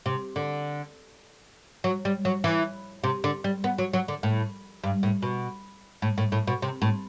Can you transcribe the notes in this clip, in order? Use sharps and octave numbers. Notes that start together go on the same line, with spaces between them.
C3
D3
F#3
G3
F#3
E3
C3
D3
G3
B3
F#3
F#3
D3
A2
G2
A2
B2
A2
A2
A2
B2
C3
A2